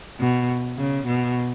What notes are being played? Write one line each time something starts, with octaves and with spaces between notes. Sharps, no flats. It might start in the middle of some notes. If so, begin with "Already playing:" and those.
B2
C#3
B2